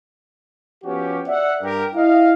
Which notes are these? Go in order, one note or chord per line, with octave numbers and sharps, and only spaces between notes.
F3 B3 C#4 F#4 G4
D5 E5 F#5
G2 G4 A#4
E4 D#5 F5